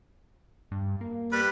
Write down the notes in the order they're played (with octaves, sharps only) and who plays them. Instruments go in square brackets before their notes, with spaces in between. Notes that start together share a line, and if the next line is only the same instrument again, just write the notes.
[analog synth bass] G2
A#3
[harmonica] G3 B4